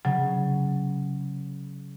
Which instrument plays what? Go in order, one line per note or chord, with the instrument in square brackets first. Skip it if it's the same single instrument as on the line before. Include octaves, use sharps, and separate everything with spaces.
[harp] C#3 [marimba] F#3